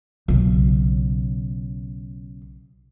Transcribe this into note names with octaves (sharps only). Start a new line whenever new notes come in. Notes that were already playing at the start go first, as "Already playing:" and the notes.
B1 C#3